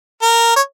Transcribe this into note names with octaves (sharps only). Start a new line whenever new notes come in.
A#4
C#5